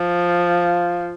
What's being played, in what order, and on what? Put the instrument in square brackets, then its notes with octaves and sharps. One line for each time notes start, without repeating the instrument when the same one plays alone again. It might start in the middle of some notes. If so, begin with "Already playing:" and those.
Already playing: [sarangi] F3